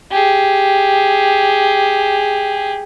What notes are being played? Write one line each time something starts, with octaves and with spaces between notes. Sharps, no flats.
G4 G#4